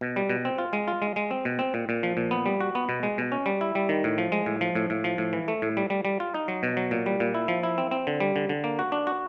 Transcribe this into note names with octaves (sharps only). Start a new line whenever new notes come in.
B2
G3
B2
C4
F4
G#3
F4
G#3
G#3
C4
B2
C4
A#2
A#2
F3
A#2
B3
G3
F#4
B3
B2
G#3
B2
C#4
G3
E4
G3
D#3
A2
F3
G#3
A2
F3
A2
A2
F3
A2
E3
A3
A2
G3
G3
G3
F4
D#4
F#3
B2
F#3
A#2
G3
A#2
E4
F3
E4
C4
C4
D3
G3
D3
D3
A#3
F#4
D4
F#4